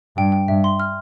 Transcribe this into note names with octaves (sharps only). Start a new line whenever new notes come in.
G2 G5
G5
G2 E5
C6
F6